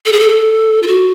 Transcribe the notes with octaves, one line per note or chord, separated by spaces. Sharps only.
A4
G#4
A4
F4
F#4